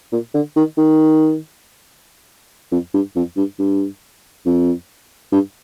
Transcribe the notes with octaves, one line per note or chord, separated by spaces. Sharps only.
A#2
D3
D#3
D#3
F2
G2
F2
G2
G2
F2
G2